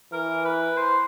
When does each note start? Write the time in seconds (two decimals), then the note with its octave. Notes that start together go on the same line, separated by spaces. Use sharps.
0.13 E3 A#4
0.45 B4
0.77 C5